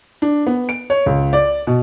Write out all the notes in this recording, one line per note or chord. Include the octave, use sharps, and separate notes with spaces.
D4
B3
D7
C#5
C#2
D5
B2